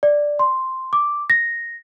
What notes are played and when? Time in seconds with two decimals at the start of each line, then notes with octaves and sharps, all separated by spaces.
0.03 D5
0.39 C6
0.93 D6
1.30 A#6